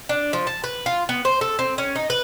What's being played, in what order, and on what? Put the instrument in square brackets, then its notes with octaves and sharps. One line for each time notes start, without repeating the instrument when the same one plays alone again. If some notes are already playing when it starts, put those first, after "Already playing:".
[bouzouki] D4
F3
A5
B4
F4
B3
C5
A4
C4
C#4
D#4
B4